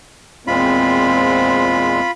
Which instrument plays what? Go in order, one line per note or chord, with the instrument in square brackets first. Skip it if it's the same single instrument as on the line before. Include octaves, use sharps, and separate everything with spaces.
[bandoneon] E2 A#2 G#3 [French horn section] C4 [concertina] F4 B5